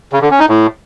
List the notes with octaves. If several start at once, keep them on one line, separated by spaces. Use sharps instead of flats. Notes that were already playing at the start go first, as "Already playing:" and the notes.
C#3
D3
C#4
D#4
A2